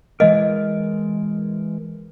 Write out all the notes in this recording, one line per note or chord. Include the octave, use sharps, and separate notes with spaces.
E3 G#3 A#4 D#5 F5